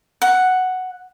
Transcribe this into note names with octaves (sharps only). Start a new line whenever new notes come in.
F#5